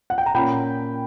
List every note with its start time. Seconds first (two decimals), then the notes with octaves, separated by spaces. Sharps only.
0.10 F#5
0.18 G5
0.26 A#5
0.34 A#2 A#3 C#4 G5 B5